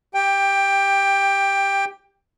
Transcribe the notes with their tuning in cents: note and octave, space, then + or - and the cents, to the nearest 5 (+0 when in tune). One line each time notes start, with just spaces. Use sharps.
G4 +0 G5 +15